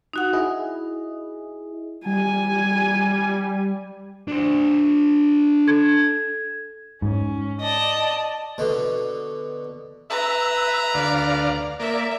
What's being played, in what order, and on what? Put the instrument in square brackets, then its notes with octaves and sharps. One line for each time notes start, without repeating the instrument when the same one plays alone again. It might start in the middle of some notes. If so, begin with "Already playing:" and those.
[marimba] D#4 F#4 F#5
[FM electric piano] E4 G#4 D#5
[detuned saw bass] G3 [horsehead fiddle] G#5
[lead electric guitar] D4 C5
[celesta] A4 G#6
[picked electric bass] G#2 [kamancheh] C#4
[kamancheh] D5 A5 [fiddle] D#5
[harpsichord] B2 D3
[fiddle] B4 A#5 [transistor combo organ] E5
[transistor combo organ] D2 D5 F5
[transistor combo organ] A#3 D5 [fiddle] E5